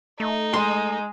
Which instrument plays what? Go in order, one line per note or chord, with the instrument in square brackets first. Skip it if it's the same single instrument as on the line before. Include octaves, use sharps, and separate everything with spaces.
[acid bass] A3 [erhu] D#4
[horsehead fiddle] G#3 [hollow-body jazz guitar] C6